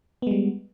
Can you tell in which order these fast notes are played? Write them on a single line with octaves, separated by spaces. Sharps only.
B3 G#3 G3